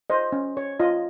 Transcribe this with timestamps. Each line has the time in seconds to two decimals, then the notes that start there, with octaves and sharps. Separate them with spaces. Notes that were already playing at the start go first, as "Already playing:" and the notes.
0.10 C5 D#5
0.32 C#4
0.57 C#5
0.80 F4 D#5